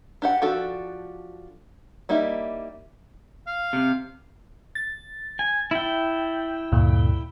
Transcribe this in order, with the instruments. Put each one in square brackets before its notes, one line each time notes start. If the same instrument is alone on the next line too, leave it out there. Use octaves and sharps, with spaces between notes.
[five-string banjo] D4 G4 F#5
F3 D4 F#4 G4 A4
G3 A#3 D#4 E4 E5
[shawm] F5
[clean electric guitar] C3
[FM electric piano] A6
[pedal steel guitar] G#5
E4 G5
[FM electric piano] D2 G2 A#2